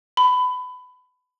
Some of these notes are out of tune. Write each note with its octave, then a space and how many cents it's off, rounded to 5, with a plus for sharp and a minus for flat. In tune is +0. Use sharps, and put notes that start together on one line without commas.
B5 +20